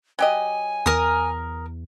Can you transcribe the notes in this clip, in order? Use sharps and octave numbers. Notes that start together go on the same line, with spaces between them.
F#3 G4 D#5 G#5
E2 A#4 D#6